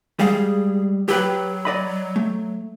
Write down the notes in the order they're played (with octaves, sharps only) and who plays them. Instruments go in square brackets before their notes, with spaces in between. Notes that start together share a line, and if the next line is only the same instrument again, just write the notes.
[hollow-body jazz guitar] G3 G#3 F5 [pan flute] G#4
[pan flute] F#3 [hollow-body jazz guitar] G4 B4 G5
[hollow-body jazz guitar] D5 D#5 B5
A3